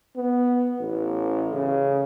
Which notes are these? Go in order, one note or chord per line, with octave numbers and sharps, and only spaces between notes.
B3
A1
C#3